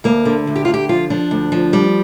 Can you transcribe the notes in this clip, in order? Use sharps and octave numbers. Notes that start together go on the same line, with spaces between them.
D2 A#3
D3
D2
G4
D3 F4
G4
F3 F4
F3 D4
D2
F3
G3